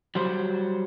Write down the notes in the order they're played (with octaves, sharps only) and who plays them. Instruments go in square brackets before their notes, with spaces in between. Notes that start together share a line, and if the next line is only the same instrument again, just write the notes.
[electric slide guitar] F#3 G3 C5